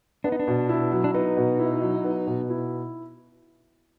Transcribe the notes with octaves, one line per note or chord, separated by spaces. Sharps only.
B3 D4
D#4
D4
B2
E4
F#3
D4
B3 D#4
B2
E4
F#3
B3
B2
E4